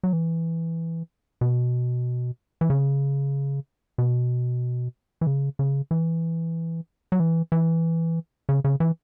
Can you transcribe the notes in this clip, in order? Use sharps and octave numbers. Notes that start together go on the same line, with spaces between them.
F#3
E3
B2
E3
C#3
B2
E3
C#3
C#3
E3
F#3
E3
E3
C#3
C#3
E3